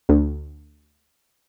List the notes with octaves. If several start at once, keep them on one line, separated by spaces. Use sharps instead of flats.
D2